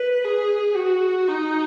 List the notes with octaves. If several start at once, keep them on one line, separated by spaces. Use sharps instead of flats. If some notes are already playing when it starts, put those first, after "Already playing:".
Already playing: B4
G#4
F#4
D#4